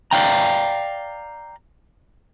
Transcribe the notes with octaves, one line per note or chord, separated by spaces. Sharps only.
D5 F5 G5 A#5